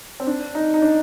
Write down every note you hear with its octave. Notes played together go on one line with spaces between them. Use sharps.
C4
D4
D#4
D#4
D4